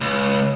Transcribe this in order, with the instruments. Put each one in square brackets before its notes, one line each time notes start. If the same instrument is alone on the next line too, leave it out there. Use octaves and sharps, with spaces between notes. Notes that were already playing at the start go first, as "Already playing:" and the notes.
[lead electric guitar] C#2